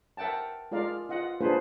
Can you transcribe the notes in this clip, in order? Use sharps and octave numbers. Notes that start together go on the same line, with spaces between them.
A#4 E5 F#5 G5 A5
G#3 F4 A#4 D5 F5
F4 D#5 F#5
A#3 D4 F4 G#4 B4 C5